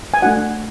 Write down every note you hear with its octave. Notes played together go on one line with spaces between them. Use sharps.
G#5
A3 D4 F#4 F#5